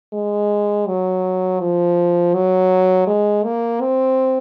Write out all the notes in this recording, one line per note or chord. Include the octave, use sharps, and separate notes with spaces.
G#3
F#3
F3
F#3
G#3
A#3
C4